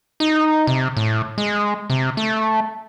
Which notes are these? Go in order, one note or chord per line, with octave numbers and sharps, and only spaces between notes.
D#4
C3
A2
G#3
C3
A3